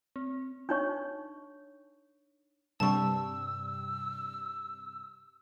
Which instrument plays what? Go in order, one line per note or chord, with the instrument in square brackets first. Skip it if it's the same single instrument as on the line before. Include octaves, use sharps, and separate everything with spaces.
[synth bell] C4
[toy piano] D4 D#4 C#5 C#6
[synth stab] G2 C3 G3 [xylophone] A5 C#6 [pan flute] E6